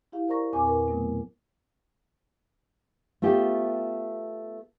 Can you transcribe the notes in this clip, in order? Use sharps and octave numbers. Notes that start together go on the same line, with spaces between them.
E4 G4 F5
A#4 C5 D5 A#5 C#6 A#6
E2 A#2 C4 A#4 G#5 D6
A#4 B4
B2 F#3 A3 B3
A3 B3 F4 G4